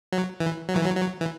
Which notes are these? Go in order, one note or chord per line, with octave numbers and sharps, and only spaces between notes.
F#3
E3
F#3
E3
F#3
F#3
E3